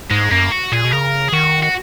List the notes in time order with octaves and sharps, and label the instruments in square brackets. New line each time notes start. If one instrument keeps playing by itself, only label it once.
[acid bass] G#2 [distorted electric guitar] G#3
[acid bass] F#2 [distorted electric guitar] A#3
[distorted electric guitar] F#4
[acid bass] A#2 [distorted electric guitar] G#4
[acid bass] B2
[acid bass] C#3 [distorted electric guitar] A#4
[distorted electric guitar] G#4
[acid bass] D#3 [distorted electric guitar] F#4
[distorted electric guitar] F#4